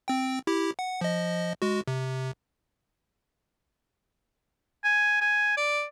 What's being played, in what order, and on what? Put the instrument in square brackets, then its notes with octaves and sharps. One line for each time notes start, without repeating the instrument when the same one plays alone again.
[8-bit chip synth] C4 G5
E4 G4
F#5
F3 D#5
G#3 F#4
C3
[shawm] G#5
G#5
D5